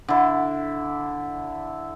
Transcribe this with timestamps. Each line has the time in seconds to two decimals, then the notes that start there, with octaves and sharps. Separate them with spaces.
0.08 D3 E4